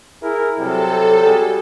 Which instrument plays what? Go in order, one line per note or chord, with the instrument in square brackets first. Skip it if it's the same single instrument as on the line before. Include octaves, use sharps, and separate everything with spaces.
[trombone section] E4 G#4 A#4
[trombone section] C3 F#3 G3 [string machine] A4
[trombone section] G3 F#4 G#4